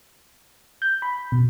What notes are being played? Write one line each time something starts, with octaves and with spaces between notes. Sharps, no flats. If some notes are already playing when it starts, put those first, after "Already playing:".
G6
B5
B2